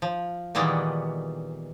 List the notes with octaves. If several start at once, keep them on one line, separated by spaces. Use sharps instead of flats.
F3
A#2 D#3 E3 G3 G#3 B3